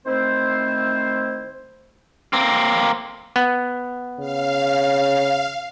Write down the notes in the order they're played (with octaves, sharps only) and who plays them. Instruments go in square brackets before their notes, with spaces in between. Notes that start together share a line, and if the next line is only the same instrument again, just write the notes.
[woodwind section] D#3 A3 C4 E4 C5
[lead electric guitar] A#3 C4
[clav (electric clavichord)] B3
[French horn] C#3 [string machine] F5